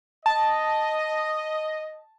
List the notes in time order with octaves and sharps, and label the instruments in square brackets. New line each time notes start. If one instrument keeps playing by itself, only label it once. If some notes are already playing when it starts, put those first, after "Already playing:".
[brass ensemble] D#5 [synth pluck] A5